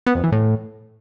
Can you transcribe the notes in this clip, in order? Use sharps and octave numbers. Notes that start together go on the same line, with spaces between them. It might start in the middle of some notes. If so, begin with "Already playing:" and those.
B3
F2
E3
A2